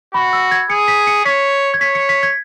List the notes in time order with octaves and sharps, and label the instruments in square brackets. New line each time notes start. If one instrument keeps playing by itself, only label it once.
[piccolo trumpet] F#4 [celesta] B5
[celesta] E6
G#6
[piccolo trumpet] G#4 [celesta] C#7
[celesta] B6
C#7
[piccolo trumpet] C#5 [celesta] B6
[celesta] G#6
[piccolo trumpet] C#5 [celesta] B6
[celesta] C#7
B6
G#6